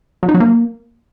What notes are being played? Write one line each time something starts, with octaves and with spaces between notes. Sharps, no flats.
F#3
D#4
F#3
A#3